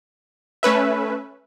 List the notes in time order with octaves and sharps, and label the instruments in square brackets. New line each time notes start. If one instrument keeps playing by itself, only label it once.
[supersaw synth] A3 C#4 B4 E5